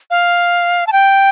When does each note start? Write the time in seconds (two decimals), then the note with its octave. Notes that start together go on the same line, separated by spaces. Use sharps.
0.10 F5
0.87 A5
0.92 G5